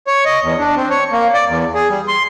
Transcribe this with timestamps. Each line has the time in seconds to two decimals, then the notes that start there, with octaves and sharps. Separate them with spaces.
0.07 C#5
0.25 D#5
0.43 E2
0.59 D4
0.77 C4
0.90 C#5
1.12 A#3
1.34 D5
1.48 E2
1.75 G#4
1.90 G3
2.08 C6